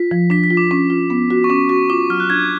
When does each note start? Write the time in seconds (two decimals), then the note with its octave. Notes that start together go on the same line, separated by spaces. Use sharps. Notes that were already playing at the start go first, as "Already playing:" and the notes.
Already playing: F4 B6
0.11 F3
0.30 D4 B6
0.44 B6
0.51 F4
0.57 D6
0.71 C#4
0.90 F4
1.10 B3
1.30 F#4
1.44 C#6
1.50 C#4 D6
1.69 F#4 C#6
1.90 F4 D6
2.10 F#3 F6
2.20 F#6
2.30 D4 G#6